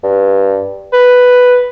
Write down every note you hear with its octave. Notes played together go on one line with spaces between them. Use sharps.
G2
B4